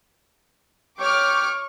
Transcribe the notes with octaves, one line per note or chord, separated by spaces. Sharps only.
G4 C#5 C#6 D6 F6